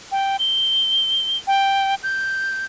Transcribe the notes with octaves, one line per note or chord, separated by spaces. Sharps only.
G5
G7
G5
G6